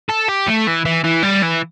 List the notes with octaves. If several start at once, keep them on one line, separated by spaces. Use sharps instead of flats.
A4
G4
A3
E3
E3
E3
G3
E3